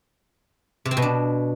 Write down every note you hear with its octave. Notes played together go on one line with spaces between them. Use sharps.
C3
C4
B2
D4